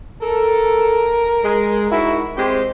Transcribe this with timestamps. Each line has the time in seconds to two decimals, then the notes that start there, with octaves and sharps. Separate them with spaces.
0.22 A4 A#4
1.44 G#3
1.92 G#2 E4 F#4
2.37 G#3 C4 G4 C5